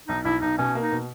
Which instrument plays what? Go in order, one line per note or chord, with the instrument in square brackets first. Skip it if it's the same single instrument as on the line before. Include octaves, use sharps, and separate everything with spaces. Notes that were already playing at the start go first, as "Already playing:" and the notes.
[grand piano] B1 [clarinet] D#4
[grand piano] B1 [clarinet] E4
[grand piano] B1 [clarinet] D#4
[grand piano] B2 [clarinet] C#4
[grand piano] A#3
[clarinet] D#4
[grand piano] B2